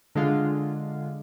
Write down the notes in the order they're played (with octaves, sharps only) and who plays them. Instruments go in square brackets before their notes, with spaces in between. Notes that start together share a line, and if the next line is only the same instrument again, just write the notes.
[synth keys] D3 G#3 F4